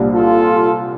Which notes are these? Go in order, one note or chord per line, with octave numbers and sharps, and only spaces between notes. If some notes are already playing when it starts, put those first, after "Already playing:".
Already playing: C2 A#2 G3 D4
F4 A4